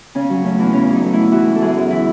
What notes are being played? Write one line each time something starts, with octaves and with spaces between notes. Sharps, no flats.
C#3 C#4
F#3
A3 C#4
E2
C#3 B3 C#4
F#3
D#4
A3
E2 E4
E3 F#4
G#3
A4
F#2 G#4
F#2
E3 E4